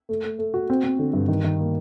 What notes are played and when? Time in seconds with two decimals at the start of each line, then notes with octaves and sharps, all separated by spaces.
0.09 A3
0.24 A3
0.39 A3
0.54 F#4
0.70 C4
0.84 C4
0.99 D3
1.13 G2
1.28 D#3
1.44 D#3
1.59 A#3